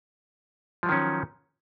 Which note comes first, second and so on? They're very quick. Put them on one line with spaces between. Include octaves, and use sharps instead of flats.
F3 F#3 D#3 C#4